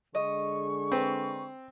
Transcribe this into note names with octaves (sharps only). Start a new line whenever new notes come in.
D3 G#3 G#4 D#5 C#6
C4 B4